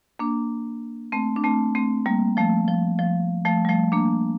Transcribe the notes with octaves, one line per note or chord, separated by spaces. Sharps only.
A#3 D4
A3 C4
D4
A3 C4
A3 C4
G3 A#3
F3 A3
F3
F3
F3 A3
G3
F3 A3
A#3 D4